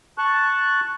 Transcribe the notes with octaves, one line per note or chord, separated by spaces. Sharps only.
A5 C#6 F#6